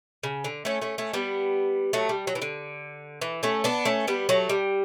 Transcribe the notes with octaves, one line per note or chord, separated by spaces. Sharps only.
C#3
D3
A3 C#4
A3 C#4
A3 C#4
G3 B3
F#3 A3
G3
F#3
E3
D3
E3
A3 C#4
B3 D4
A3 C#4
G3 B3
F#3 A3
G3